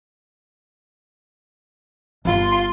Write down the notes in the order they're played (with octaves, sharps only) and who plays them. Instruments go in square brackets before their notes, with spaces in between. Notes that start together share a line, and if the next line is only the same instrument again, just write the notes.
[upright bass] G1 [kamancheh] F4 C6